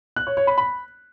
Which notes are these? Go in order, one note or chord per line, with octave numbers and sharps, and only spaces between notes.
F#6
C#5
C#5
B5
B5